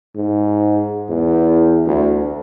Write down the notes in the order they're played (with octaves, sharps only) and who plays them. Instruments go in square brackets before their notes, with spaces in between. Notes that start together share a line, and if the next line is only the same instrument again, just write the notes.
[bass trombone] G#2
E2
D2